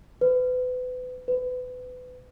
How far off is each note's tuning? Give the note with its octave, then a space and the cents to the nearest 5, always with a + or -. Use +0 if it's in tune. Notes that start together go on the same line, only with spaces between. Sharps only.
B4 +30
B4 +25